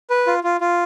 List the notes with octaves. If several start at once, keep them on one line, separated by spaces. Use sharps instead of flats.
B4
F4
F4
F4